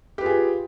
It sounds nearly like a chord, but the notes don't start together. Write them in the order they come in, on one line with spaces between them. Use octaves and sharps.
G4 B4 F4 G#4